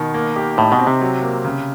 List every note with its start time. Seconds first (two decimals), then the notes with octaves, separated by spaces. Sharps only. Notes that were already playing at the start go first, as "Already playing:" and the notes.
Already playing: B2 D#3
0.14 A#3
0.36 G4
0.58 A2 D#4
0.72 B2
0.79 C4
0.87 C3
1.01 F#3
1.22 A#3
1.44 C#3